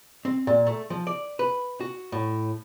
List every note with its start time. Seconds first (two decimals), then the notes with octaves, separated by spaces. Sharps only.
0.25 C4
0.47 A#2
0.67 A3
0.90 F3
1.07 D5
1.39 B4
1.80 F#4
2.12 A2